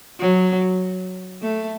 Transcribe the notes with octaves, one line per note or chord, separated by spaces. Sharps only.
F#3
A3